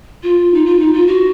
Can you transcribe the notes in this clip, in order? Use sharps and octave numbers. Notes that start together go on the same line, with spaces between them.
F4
D#4
F4
D#4
F4
F#4